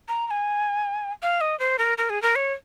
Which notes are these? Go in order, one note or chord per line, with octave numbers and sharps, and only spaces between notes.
A#5
A#5
G#5
F5
D#5
C5
A#4
A#4
G#4
A#4
C#5